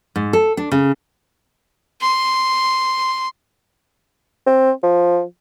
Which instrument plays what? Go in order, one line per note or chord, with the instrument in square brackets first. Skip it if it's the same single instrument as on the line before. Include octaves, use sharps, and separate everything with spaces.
[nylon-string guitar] G#2
A4
D4
C#3
[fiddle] C6
[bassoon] C4
F3